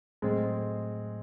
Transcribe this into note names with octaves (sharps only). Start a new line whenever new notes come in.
A2 F#3 G#3 A3 C4